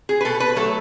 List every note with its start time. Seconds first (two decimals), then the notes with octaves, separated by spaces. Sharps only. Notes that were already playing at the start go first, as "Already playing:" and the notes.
0.09 G#4
0.21 B4
0.25 B2 A4
0.40 B4
0.56 F#3 A3 A4